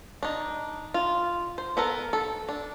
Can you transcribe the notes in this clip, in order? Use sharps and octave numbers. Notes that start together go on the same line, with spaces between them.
D4 D#4
F4
C5
B3 A4 A#4
A4
D4